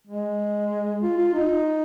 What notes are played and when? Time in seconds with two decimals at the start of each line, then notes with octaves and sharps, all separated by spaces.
0.07 G#3
1.02 F4
1.18 F4
1.34 D#4